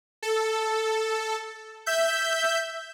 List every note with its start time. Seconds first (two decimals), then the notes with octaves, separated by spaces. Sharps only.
0.23 A4
1.86 E5 G6